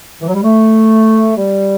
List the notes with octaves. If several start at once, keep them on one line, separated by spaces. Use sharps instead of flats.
E3
F#3
G3
A3
G3